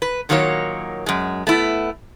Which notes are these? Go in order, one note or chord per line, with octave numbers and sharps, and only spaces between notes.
B4
A#2 D#3 F#3 A#3 E4 C#5
F#2 G#3
A3 B3 E4